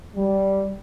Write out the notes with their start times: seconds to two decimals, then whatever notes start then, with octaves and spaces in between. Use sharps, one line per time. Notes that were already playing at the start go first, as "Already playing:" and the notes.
0.15 G3